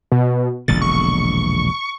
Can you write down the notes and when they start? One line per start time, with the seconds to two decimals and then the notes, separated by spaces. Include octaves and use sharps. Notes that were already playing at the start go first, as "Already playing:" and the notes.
0.12 B2
0.68 E1 A#1 D3 A6
0.82 C#6